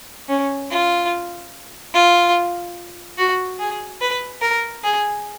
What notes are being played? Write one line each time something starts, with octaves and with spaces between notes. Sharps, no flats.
C#4
F4
F4
F#4
G#4
B4
A#4
G#4